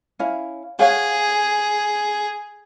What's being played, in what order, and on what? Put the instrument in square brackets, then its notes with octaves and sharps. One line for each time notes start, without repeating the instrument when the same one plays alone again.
[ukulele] C#4 E4 F5
[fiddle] G#4 [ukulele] C#5 F5 F#5